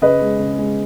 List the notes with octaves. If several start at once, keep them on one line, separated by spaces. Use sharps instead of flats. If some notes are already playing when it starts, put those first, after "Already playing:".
C#3 B4 D#5
G#3
C#3
G#3